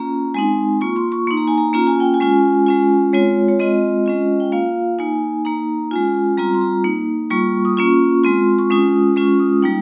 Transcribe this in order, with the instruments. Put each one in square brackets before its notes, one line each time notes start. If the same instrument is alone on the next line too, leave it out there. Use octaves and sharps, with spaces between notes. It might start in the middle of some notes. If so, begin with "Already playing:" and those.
Already playing: [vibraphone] A#3 C#4 F4 A#5
G#3 C4 D#4 G#5
A#3 F4 C#6
C6
C#6
A#3 D#4 C6
A#5
G#5
A#5
A#3 C#4 F4 A#5
G#5
G5
G#5
G#3 C#4 F4
G#3 C#4 F4
G#3 C4 F4 C#5
C#5
G#3 C4 F4 D#5
G#3 C#4 F4
G5
A#3 F4 F5
A#3 D#4 G#5
A#3 D#4 A#5
G#3 C#4 F4 G#5
G3 C4 F4 A#5
C6
A#5
A#3 D#4
G3 A#3 F4 C#6
D#6
A#3 C#4 F4 C#6
G#3 C4 F4 C6
C#6
G#3 C#4 F4 D#6
G#3 C#4 F4 C#6
D#6
G3 A#3 D#4 G5